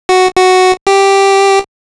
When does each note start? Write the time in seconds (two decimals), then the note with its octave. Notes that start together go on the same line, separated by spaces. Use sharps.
0.09 F#4
0.36 F#4
0.87 G4